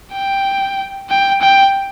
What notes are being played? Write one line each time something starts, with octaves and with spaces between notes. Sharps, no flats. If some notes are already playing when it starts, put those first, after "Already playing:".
G5
G5
G5